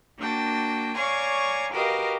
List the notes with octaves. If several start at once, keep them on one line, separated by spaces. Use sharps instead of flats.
A#3 D4 F#4 G5 A5
C#5 D5 F5 G#5 A#5 C#6
F#4 G4 A#4 B4 D#5 F5